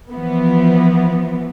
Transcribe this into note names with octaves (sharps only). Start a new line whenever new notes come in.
E3 F3 B3